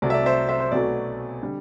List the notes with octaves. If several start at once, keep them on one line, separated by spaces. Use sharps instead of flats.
C2 C3 F#3 A3 D5
E5
D5
C5 E5
C5 E5
C5
B1 B2 F#3 A3 D5
D3 G3